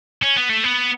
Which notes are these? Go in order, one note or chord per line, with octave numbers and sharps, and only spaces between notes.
C#4
B3
A3
B3